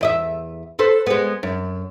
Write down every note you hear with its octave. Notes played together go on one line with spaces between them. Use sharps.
E2 D#5 E5
A4 B4 C5
G#3 B3
F#2